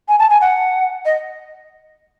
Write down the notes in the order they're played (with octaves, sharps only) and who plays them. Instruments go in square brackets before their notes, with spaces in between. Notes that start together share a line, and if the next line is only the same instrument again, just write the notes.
[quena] G#5
A5
G#5
F#5
D#5